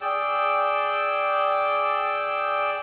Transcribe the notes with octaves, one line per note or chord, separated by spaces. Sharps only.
G#4 D5 G5 E6